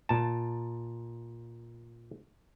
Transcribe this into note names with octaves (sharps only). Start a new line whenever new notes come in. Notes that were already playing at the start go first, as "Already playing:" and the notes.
A#2 A5